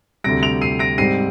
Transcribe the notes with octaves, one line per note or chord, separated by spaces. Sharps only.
D2 C3 G3 A#6 D7
D7 F7
C7 D#7
A#6 D7
G#2 G3 C4 C7 D#7